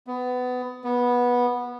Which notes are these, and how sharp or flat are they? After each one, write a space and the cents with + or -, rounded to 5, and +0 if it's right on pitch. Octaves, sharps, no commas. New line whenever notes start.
B3 +20
B3 -15